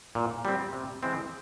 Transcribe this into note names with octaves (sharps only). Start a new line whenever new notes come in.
A#2
G3 C4
C3
E3 G#3 C4 E4